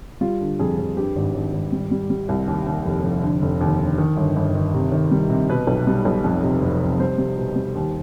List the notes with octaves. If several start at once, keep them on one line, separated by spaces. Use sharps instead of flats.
G3 F4
D3
F2 G#4
F2
G2 G4
G#1
G#1
G#1
G3
G3
G3
C2
D#2 G4
D#2
F1
F1
D3
F1
D#2
D3
D#3
G1
G1
D#3
C3
D#3
G3
C3
B2 B4
B1
G3
B1
F2
C3
F1
C3
G3 C5
G3
B2
G3
D#2